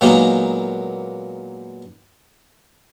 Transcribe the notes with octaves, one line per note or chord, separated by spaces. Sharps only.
A#2 F#3 G#3 A#3 B3 D#4